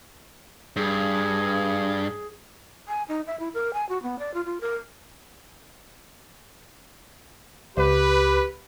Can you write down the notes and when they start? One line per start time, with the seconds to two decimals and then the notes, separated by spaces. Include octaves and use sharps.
0.76 G2 G#4
2.88 G#5
3.08 D#4
3.27 E5
3.40 E4
3.54 A#4
3.74 G#5
3.89 F#4
4.03 B3
4.19 D5
4.34 F4
4.45 F4
4.61 A#4
7.77 C#2 G4 B4